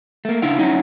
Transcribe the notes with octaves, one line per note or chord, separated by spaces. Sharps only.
A3 A#3
C#3 D4 E4 F5
F#3 C#4 D#4 E4 F#4